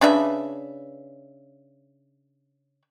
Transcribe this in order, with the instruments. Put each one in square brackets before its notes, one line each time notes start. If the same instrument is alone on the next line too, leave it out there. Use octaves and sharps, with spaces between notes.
[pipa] C#3 D4 B4 E5